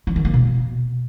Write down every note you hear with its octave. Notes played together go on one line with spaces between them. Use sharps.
E3
D#3
A#3
B2